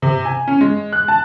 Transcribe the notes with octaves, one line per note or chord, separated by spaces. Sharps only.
C3
G#5
C#4
G#3
F#6
A5